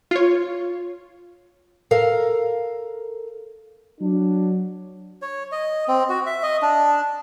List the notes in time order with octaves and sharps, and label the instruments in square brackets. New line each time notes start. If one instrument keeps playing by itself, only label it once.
[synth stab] F4 C#5
[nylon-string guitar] A4 A#4 F5
[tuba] F#3 [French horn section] D4
[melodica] C#5
D#5
C4
F#4
E5
D#5
D4